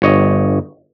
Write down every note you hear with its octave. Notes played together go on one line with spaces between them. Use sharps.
G1 C#5 D#5